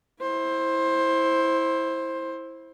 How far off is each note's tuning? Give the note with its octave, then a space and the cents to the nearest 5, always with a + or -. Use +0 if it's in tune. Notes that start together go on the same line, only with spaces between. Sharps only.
E4 -5 C5 +15